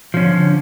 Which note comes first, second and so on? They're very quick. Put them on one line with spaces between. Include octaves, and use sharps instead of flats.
F3 C#4 D3